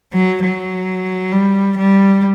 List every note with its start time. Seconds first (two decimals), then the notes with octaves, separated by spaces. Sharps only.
0.13 F#3
0.43 F#3
1.32 G3
1.77 G3